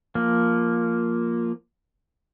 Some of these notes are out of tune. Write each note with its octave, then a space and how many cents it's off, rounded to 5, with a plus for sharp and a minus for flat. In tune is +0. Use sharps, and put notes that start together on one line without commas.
F3 +0 A#3 +0